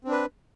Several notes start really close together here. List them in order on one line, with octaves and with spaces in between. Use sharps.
C4 D4 B4